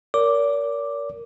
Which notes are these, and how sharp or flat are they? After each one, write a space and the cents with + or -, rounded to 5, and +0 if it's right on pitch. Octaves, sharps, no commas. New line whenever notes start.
A#4 +0 D5 -45 D6 +0